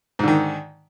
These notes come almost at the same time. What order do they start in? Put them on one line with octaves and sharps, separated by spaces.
G#2 D3 D#3